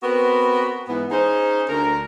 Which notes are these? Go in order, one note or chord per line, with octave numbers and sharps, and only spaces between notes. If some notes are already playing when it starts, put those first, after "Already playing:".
B3 C4 F#4 A#4 B4
G#2 E3 B3
C#4 D#4 G#4 C5
D2 A#4